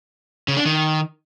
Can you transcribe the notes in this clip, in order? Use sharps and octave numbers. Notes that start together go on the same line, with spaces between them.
C#3
D4
D#3